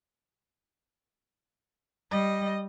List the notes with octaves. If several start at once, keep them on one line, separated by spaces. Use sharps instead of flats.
G3 D#5